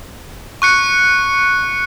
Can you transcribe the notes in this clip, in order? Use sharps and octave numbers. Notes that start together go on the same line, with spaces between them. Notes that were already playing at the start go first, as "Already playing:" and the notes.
C#6 F#6 C#7